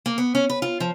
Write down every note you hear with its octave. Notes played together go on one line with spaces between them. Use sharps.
A#3
B3
C#4
B4
F4
F3